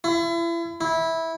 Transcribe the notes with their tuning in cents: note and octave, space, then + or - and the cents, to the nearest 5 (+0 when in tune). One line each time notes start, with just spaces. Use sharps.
E4 +35
E4 -15